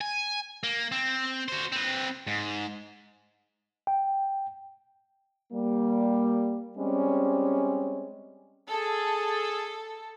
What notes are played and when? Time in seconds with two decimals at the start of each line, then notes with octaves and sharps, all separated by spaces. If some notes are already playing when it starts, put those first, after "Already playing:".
0.01 G#5
0.63 A#3
0.92 C4
1.48 F#4 C5
1.72 C4 B4
2.27 G#2
3.87 G5
5.53 G3 A#3
6.78 G3 G#3 C4 C#4
8.70 G#4 A4